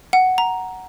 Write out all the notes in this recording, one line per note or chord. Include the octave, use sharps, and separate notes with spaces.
F#5
A#5